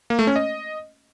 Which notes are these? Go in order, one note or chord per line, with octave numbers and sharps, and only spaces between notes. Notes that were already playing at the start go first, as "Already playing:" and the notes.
A#3
A3
C#4
D#5